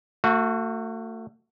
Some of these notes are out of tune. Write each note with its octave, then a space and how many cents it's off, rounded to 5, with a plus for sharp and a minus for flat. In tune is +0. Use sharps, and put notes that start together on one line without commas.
A3 +35 F#4 -15